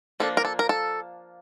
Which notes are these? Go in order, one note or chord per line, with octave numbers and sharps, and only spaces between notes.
F3 A#3 D4 A4
A#4
A4
A#4
A4